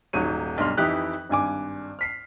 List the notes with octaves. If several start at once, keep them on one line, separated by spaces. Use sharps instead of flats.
D#1 G#2 F#3 C#5 D#7
B1 G2 C6 F6
F2 E3 D#4 E4 G4 F#6
G#1 G2 G#5 D6
F6 B6 C7